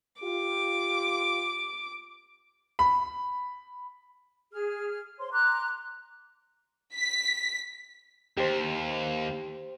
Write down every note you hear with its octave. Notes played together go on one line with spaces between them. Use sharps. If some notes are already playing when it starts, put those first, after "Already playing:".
F4 G4 D6
B5
G#4 F6
C5 C#5 C6
A#5 C6 D6 F#6
B6
D#2 G4 C5